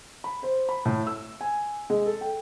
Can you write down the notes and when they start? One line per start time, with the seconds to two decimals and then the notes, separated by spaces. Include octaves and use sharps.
0.24 B5
0.43 C5
0.69 B5
0.85 A2
1.07 E6
1.41 G#5
1.90 G#3
2.06 A4
2.21 G5